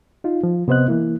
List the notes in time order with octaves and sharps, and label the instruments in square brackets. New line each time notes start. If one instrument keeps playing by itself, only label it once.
[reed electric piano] D#4 F4
F3
C3 B3 C5 D#5 F#6
E3 A#3 E4